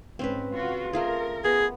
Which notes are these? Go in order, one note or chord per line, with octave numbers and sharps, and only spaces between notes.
G#2 C4 C#4 B4
C#3 F4 F#4
A3 F4 G#4 A#4
B3 G#4